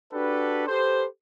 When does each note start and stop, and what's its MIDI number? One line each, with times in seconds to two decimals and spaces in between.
0.13 0.63 62
0.13 0.63 66
0.13 0.63 67
0.13 0.63 69
0.13 0.63 71
0.67 1.06 67
0.67 1.06 69
0.67 1.06 71
0.67 1.06 72